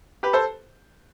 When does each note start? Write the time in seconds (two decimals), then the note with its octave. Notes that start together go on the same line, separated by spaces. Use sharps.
0.23 G4 B4
0.33 A4 C5